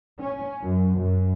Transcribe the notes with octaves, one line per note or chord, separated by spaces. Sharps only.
C#4
F#2
F#2